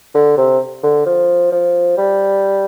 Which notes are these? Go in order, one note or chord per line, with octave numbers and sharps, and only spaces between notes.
D3
C3
D3
F3
F3
G3